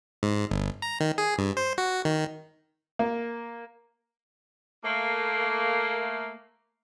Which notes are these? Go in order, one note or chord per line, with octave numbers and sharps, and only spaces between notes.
G#2
G1
A#5
D#3
G#4
G2
C5
F#4
D#3
A#3
A3 A#3